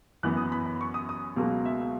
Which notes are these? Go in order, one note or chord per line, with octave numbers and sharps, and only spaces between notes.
F#2 E3 B3 F#6
D#6
B5
B5
C#6
D#6
D#6
C#2 B2 F#3 A#3
E5